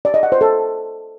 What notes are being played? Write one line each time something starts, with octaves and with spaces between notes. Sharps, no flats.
D5
D#5
F#5
C5
A4